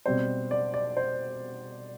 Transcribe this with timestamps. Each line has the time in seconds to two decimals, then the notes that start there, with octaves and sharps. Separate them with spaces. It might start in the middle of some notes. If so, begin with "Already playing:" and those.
0.06 B2 G3 C4 C5
0.51 D5
0.74 D5
0.97 C5